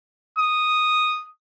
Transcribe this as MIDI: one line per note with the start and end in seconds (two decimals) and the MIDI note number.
0.38 1.27 87